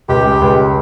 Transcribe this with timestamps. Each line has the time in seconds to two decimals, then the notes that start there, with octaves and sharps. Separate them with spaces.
0.09 C#2 G4
0.25 G#3
0.41 C#2